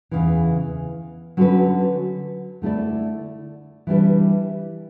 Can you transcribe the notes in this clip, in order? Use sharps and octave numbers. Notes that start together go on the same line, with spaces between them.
E2 C#3 E3
D3 F#3 C#4 F#4 B4
D3 A3 E4 A4 D5
E3 G3 D4 G4 B4